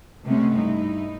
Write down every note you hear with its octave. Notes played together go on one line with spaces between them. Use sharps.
C3 G#3 A3 B3 C#4
G2 D#4 E4